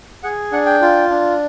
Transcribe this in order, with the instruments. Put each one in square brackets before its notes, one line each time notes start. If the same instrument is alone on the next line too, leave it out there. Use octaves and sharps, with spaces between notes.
[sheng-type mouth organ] G#4 F#5
D4 F#5
G5
F4
D4